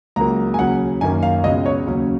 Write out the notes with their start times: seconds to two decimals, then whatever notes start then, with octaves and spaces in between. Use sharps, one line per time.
0.16 C#2 C#3 F#3 A#3 A#5
0.54 G#5
0.59 D#2 C#3 F#3 F#5
1.01 F#2 D#3 A#3 C#4 G#5
1.23 F5
1.44 C#2 B2 G#3 C#4 D#5
1.66 C#5
1.87 D#2 C#3 F#3 C#4